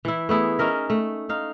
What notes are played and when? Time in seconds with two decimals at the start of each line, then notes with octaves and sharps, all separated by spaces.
0.05 E3 E4
0.29 A3 B3 E4 G#4
0.59 C#4 D#4 A#4 E5
0.90 A3
1.29 D#4 F5